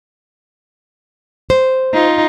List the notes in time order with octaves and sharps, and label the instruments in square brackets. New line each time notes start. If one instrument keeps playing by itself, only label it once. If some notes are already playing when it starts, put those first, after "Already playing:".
[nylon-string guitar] C5
[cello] D#4 F4